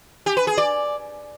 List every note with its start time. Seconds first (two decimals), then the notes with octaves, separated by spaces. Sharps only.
0.26 G4
0.37 B4
0.47 G#4
0.58 D5